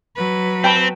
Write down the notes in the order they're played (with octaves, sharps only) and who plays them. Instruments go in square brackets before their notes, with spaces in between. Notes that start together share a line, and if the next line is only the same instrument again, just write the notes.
[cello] F#3 B4
[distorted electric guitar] C4 [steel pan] G5 A5 B5